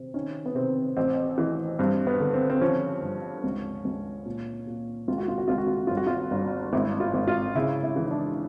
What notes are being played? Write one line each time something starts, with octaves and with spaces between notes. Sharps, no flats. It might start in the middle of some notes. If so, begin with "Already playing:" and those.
Already playing: C3
D#3 C#4
B3
C3 C4
A1 C4
E3
G2 C4
B3
D3
C4
C4
F3 C#4
G1
C#2
C#2
A#2
A#2
C#2 F4
F#4
F4
F#4
C#2 F4
F#4
F4
F#4
G1 F4
F#4
F4
G1
G#1 E4
F4
G#1
F4
C#3 E4
E4
E3
D#4
D4